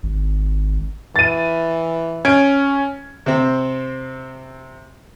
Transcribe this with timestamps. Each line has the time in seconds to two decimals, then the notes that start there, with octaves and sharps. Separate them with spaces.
0.03 G#1
1.16 E3 A6 D#7
2.25 C#4 G#6 D7
3.26 C3 C4